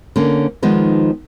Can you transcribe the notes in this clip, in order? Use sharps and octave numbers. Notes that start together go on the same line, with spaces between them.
D3 A#3 C#4
D#3 F3 G#3 B3 D#4